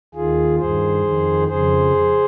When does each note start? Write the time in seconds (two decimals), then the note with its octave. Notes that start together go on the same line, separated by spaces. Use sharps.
0.14 D#2 D#3 F4 G#4
0.59 G2 D#3 G#4 C5
1.04 F2 D#3
1.47 F2 C#3 G#4 C5